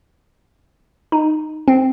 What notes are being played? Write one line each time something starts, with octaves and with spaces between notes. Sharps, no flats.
D#4
C4